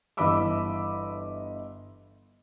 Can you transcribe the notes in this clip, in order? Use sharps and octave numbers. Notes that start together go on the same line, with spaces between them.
G1 E3 D#5 B5 D6 E6